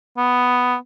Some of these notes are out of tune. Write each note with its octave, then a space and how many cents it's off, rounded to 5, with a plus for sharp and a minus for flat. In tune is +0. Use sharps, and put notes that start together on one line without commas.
B3 +5